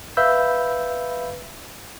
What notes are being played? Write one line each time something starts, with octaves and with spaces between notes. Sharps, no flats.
B4 E5 F5 B5 E6 G6